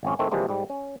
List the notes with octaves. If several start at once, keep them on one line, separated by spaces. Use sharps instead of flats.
G#1 F2 C#4
A2 D#3 A3 C4
C3 E3 F3 G3 G#3 A#3
G#2 G3
C#4